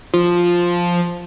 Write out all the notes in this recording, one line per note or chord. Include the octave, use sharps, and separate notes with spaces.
F3